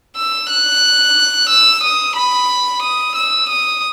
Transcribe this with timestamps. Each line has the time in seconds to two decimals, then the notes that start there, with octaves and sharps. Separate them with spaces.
0.16 E6
0.50 F#6
1.50 E6
1.83 D#6
2.16 B5
2.82 D#6
3.16 E6
3.49 D#6